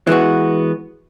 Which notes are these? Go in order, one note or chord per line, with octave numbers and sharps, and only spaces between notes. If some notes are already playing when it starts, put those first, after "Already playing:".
E3 G#3 B3 F#4